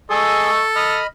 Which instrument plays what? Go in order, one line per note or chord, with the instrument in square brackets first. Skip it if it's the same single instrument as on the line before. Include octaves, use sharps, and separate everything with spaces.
[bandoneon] G#4 G#5 [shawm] A4 [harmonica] D#5 C#6 E6
[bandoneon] D#5 B5 [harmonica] D#6 F6